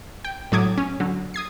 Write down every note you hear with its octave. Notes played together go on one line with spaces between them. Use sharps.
G5
A2 C3 F#3 D6 D#6 G#6
C#4
D3 F#3
D#6 G#6 C7